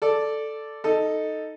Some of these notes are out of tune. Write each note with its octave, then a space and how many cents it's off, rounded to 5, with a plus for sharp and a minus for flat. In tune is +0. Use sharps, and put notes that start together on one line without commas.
A4 +0 D5 +0
D#4 +0 A4 +0